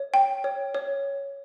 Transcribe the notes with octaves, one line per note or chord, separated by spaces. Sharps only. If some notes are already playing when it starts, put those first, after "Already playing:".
Already playing: C#5
G5
C#5
C#5